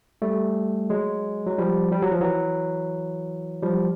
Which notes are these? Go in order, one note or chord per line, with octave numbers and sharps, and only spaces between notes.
G3 A3
F#3 G#3
F#3
F3 G3
G3
F#3
F3
E3 F#3
F3 G3